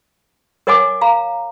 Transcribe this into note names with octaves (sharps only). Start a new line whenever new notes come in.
A#4 C#5 D#5 F#5 G#5 D6
F5 A#5